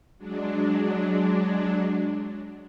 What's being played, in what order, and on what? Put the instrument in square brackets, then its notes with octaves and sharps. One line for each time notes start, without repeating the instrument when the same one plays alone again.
[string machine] F#3 G#3 D4